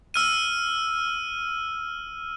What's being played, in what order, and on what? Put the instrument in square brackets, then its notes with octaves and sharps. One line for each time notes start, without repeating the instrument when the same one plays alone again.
[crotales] E6 F6 D#7